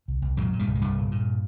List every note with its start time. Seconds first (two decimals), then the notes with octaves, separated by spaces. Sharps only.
0.08 C2
0.22 C2
0.37 F#2 A#2 F#3
0.53 A#2
0.59 G2 G3
0.67 C2
0.75 G#3
0.81 C2 G2 G3
0.97 A#2
1.12 A#2